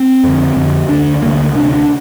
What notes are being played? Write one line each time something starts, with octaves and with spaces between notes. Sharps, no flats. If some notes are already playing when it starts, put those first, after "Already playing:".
Already playing: C4
F2 D3
F2 D3
D2 D3 D4
D2 D3 A#3
D2 C3 D4
D4